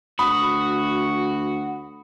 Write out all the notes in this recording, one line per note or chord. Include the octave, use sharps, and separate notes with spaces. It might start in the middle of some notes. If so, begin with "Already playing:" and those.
D2 F#4 B5 D#6